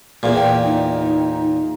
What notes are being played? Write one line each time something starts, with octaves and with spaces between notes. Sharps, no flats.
E2 A#2
G5
D#4